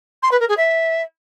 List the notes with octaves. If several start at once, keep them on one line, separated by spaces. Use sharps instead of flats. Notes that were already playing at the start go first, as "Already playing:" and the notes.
C6
B4
A#4
G#4
E5